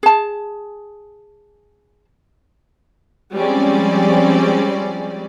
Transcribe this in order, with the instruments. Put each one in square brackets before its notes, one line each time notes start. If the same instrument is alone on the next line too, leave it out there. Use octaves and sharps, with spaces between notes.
[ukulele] G#4 A5
[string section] F3 G3 G#3 C4 C#4 D5